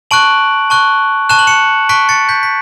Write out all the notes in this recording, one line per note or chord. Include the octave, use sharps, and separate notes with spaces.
A5 C#6 F#6 D7 F#7
A5 C#6 F#6
A5 C#6 F#6 E7
F#7
C#7 E7
A5 C#6 F#6 B6 D7
A6 C#7
G6 B6
B6